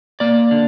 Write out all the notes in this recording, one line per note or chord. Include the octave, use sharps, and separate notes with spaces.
A#3 D5
D3